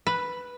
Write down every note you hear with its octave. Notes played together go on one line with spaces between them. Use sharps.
B4